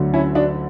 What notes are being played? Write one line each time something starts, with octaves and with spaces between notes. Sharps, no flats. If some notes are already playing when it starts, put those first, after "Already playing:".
Already playing: D2 D3 F#3 A3
C#4 E4
D4 F#4